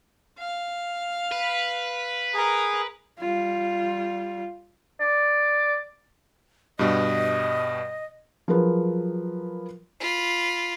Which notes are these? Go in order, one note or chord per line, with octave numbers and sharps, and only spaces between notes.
F5
B4
G#4 A#4 A#5
G3 F4
D5
G2 B2 G3 D#5
F3 F#3 G#4 A#4 B4
F4 B5